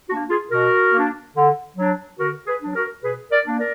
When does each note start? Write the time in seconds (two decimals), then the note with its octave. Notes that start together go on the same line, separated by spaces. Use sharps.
0.09 A#3 D4 F#4
0.29 F4 G#4
0.51 B2 F#4 A#4
0.93 A#3
0.98 D4
1.35 D3
1.76 F#3 D4
2.19 D3 F#4 A#4
2.47 G#4 B4
2.62 F#3 D4
2.75 F#4 A#4
3.03 B2 G#4 B4
3.31 A#4 D5
3.45 A#3 D4
3.59 A#4 D5